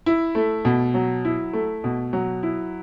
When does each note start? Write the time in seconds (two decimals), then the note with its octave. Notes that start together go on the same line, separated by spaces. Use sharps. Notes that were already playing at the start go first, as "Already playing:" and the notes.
0.06 E4
0.35 A3
0.65 B2
0.94 F#3
1.25 E4
1.53 A3
1.84 B2
2.13 F#3
2.43 E4